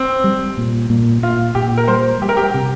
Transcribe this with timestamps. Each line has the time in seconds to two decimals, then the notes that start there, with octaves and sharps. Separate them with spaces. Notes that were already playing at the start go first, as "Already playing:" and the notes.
Already playing: C4
0.24 G3
0.57 A#2
0.90 A#2
1.22 A#2 F4
1.55 A#2 G4
1.78 A#4
1.88 G3 C5
2.21 G3 G4
2.29 A#4
2.37 G4
2.54 C3